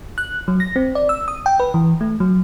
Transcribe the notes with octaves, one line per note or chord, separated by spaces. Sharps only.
F#6
F#3
A#6
C4
D5
E6
D#6
G5
B4
E3
A3
F#3